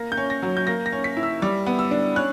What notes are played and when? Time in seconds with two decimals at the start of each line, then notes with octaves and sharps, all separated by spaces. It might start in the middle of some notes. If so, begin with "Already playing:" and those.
Already playing: A#3 A#6
0.12 G6
0.17 C#4
0.30 A#6
0.42 F#3
0.57 G6
0.67 A#3 A#6
0.86 A#6
0.92 C#4
1.04 B6
1.17 E4
1.23 E6
1.42 G3 D6
1.66 B3
1.79 E6
1.91 D4
2.16 C#4 F#6